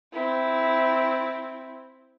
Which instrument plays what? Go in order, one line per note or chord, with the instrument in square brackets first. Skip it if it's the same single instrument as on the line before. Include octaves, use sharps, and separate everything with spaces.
[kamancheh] C4 E4